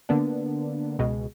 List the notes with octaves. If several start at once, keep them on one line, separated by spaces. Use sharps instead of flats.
D3 A#3 B3 D4
C#2 B2 G#3